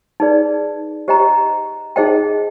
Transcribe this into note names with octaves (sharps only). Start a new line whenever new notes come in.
D#4 G#4 B4 D5
G4 C5 D#5 G5 A#5
D#4 G#4 C5 D#5 G5